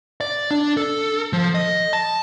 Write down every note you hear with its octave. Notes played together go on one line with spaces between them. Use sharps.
D5
D4
A4
F3
D#5
A5